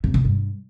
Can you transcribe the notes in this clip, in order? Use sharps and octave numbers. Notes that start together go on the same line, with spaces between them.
C3
E3
G2